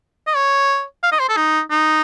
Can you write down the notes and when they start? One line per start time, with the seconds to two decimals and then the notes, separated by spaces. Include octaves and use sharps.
0.27 D#5
0.35 C#5
1.02 F5
1.12 D#5
1.19 C5
1.29 A4
1.36 D#4
1.70 D#4